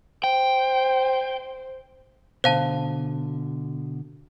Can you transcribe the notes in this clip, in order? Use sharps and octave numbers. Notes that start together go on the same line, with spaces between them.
C5 G5
B2 D3 C5 F5 A5